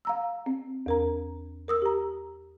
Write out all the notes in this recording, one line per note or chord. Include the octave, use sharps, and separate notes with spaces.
F5 A#5 E6
C4
E2 A#4 A#5
A#4 D#6 E6
G4 A#5